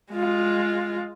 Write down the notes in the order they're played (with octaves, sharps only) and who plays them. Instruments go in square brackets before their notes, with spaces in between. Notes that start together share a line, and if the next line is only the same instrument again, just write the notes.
[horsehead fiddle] G#3 F4